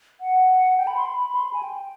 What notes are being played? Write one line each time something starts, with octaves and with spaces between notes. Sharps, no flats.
F#5
G5
B5
C6
B5
B5
C6
B5
G#5
G5